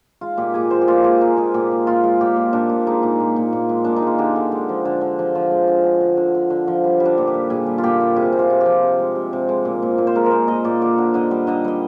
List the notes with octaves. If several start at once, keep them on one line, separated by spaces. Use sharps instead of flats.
G#3 F4
A#2 G4
A#2 G#4
G#3 C5
G4
A#2 F4
G#3 G#4
G#3 A#4
G#3 G#4
A#2 G4
G#3
A#2 F4
G#3
A#2 G4
A#2
A#2 D4
A#2
G#3 D#4
A#2
A#2
A#2
A#2
G#3
A#2 D4
D#4
G#3 F4
D3 G4
D3
G#3
F3
D3
D3
F3
F3
G#3
D3
D3
D3
D3
D3
D3
F3
G3
G3
D4
A#2
G4
G3
A#2 G#4
G3
F4
A#2 G4
G3
C3 G#4
C3
F4
C3
F3 G4
C3
G#3
C3
C3
G#3
A#2
A#2
A#2
C5
G#3 A#4
A#4
A#2 C5
A#2 D#5
A#2 D5
D3 D5
D3
D3 D#5
G3
D3 D#5
G3 D#5